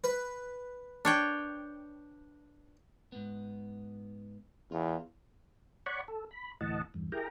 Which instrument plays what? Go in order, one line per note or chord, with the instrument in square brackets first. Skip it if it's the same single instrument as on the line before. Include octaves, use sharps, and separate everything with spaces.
[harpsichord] B4
[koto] D4 C#5 G5
[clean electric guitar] G#2 B3
[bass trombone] E2 [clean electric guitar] F4
[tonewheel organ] C#5 D5 F#5 B5 C#6
A4
B5
D2 A2 E3 D#5 F#5 A5
E2 G2
E4 G4 G#4 A#4 G5 A#5